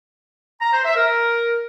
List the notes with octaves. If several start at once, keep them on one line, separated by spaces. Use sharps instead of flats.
A#5
C5
E5
A#4